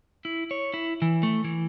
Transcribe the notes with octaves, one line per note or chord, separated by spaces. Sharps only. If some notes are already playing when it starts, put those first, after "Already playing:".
E4
C#5
E4
E3
A3
E3